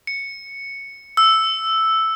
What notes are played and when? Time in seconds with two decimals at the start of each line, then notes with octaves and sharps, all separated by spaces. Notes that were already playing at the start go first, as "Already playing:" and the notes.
0.07 C#7
1.17 E6